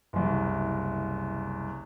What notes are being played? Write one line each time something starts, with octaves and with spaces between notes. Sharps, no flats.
F#1 C2